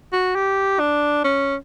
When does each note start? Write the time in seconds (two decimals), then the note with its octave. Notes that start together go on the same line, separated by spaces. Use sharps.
0.13 F#4
0.35 G4
0.80 D4
1.24 C#4